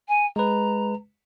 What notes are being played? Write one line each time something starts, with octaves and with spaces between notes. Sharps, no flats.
G#5
G#3 B4 A#5